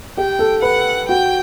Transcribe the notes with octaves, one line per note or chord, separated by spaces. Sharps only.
G4 G5
A4
B4 F#5
F#4 G5